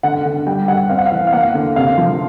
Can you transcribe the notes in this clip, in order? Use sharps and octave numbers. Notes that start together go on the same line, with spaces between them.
D3 F#5
D3
G3 G5
G3 F#5
C4 F5
F#5
F5
E3
F5
A#3 F#5
D3
C3 F5
F3